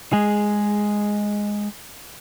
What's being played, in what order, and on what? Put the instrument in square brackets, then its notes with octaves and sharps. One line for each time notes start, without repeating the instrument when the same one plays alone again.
[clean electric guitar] G#3 G#4